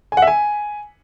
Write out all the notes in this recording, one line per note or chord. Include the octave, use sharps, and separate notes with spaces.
G#5
F#5
E5
G#5